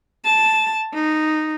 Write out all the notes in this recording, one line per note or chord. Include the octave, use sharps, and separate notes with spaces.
A5
D#4